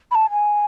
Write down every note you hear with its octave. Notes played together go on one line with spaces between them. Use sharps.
B5
A5
G#5